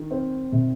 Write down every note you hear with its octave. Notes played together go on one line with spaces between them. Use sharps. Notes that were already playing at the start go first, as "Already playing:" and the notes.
Already playing: D#3
C4
C3